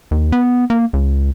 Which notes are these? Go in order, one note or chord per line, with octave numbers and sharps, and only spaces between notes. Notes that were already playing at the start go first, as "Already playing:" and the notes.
D#2
B3
A#3
C#2